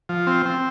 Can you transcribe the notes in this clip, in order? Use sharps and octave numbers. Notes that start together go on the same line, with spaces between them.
F3
C4
C4